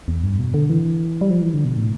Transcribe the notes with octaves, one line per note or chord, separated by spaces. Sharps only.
E2
G2
B2
D3
E3
G3
F3
E3
D3
B2
A2